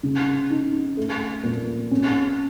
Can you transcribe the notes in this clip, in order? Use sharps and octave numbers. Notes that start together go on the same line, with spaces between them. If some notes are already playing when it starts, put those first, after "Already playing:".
C#3
D#4
A3
A#2
C#4